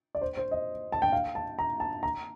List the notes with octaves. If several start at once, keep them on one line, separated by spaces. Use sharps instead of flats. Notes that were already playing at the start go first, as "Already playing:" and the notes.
D5
C5
C5
D#5
A5
G5
F5
A5
A#5
A5
A#5